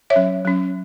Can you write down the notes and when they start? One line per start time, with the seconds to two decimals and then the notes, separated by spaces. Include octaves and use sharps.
0.10 C#5 E5
0.16 F#3 C#4
0.45 F#3 C#4